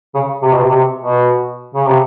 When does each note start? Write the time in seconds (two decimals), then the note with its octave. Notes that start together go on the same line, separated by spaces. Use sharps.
0.15 C#3
0.43 C3
0.52 B2
0.62 C3
0.72 C3
1.00 B2
1.75 C#3
1.87 C3